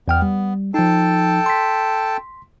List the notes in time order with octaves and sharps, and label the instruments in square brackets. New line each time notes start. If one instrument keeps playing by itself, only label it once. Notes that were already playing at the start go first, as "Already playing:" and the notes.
[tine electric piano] E2 G5 F6 [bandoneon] B3
[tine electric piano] G3
[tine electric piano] F3 D#4 [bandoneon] A4 G5 A5
[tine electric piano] C6 B6